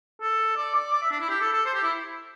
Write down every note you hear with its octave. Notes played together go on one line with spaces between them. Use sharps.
A4
D5
D5
D5
E5
D4
E4
G4
A4
A4
C5
G4
E4